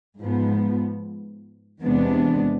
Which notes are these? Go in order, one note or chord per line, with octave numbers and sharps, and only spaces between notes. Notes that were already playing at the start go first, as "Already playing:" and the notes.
G#2 F3 B3
E2 C3 G#3 B3 D4